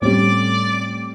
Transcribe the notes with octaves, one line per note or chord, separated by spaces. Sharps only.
A2 G3 A3 C4 C#4 D5 D6